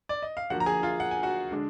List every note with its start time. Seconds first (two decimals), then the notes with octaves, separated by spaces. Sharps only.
0.09 D5
0.22 D#5
0.37 F5
0.50 D3 F3 A#3 F#4 F#5
0.60 A#5
0.66 G#4 G#5
0.83 F4 F5
1.00 F#5
1.11 G#5
1.23 F#4 F#5
1.51 D3 G#3 D4